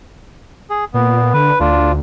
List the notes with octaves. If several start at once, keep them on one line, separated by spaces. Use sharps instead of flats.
G#4
A#2 B3
D3 B4
D2 D4 F4